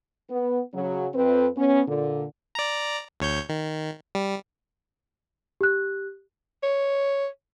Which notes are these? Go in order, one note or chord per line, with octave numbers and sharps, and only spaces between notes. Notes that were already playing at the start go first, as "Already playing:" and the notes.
B3
C#3 F#3 C#4
F2 C4 B4
B3 C#4
A#2 D3
D5 A#5
D2 C#5 G6
D#3
G3
G4 F#6
C#5